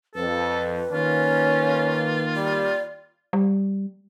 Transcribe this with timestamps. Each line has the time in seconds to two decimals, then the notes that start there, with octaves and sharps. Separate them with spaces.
0.15 F2 A4 B4
0.92 D#3 A#3 C#4 F4
2.36 G3 D5
3.33 G3